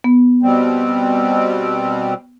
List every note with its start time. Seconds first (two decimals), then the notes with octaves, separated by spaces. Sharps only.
0.04 B3
0.43 B2 G3 C4